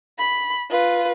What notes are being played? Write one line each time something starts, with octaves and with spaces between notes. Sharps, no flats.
B5
F4 B4